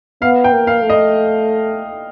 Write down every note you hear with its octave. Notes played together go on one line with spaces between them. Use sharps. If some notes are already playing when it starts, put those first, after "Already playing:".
B3 F5
G5
A#3
F5
A3
D#5